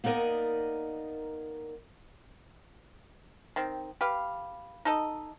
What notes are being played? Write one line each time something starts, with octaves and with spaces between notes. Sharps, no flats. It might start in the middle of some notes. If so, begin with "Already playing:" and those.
A#3 B3 D#4 A#4 D5 D#5
D#3 C4
G4 B4 F5
D#4 A4 D#5